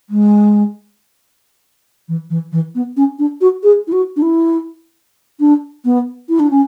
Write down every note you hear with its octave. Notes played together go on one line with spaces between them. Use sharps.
G#3
E3
E3
E3
B3
C#4
D4
F#4
G#4
E4
F#4
D4
E4
D4
B3
E4
D4
C#4